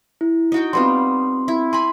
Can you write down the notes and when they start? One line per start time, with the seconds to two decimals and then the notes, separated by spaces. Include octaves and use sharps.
0.21 E4
0.52 D#4 F#4 G5
0.73 G3 B3 C4 F4 C6
1.48 E4
1.73 G#5 B5 C6